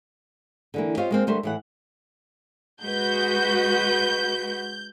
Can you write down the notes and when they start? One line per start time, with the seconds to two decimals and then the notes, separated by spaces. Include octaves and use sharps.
0.74 D3 E3 A#3
0.97 C4 F4 G4 C#5 D#5 F5
1.11 G#3 A#3 C4
1.27 D3 G3 A3 A#4 C5
1.43 A2 E3 F#5
2.83 G#3 F#4 B4 G6